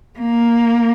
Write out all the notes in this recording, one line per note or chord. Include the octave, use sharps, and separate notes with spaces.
A#3